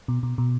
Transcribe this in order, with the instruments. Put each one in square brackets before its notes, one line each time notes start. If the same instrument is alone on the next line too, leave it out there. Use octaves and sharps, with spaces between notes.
[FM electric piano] B2
B2
B2